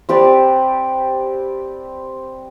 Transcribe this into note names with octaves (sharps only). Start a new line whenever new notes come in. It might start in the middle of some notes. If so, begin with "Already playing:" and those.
C4 G4 B4 D5